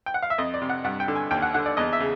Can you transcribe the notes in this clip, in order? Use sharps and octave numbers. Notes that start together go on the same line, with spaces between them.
G5
F#5
F5
E5
F2 D#5
D5
C3
F#5
G2 F#5
G5
D3
G#5
D#2 G5
F#5
D3 F#5
D5
E2 D#5
E5
C#3